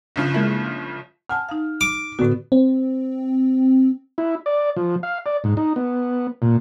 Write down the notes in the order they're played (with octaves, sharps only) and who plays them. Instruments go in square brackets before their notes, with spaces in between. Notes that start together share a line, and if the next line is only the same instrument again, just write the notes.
[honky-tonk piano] G1 C#3 F3
[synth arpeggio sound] G#3 A#3 E4
[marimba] F#5 G#5 A5 [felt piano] F6
[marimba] D#4 F5
[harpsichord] D6
[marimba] A2 D3 F#4 [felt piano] B3
[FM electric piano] C4
[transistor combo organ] E4
D5
F3
F5
D5
G#2
D#4
B3
A#2